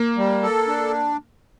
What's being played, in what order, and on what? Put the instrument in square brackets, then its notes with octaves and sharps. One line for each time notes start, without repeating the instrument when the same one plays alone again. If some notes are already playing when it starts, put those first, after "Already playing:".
Already playing: [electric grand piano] A#3
[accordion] G3
A4
D4